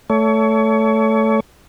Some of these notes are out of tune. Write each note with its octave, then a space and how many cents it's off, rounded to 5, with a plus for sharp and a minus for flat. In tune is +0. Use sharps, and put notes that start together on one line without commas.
A3 +0 C#5 +30